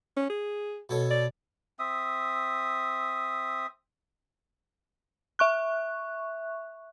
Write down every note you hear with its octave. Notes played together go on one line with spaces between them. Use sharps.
C#4
G#4
B2 A4 C#5
D5
C4 E5 D#6
E5 C#6 F#6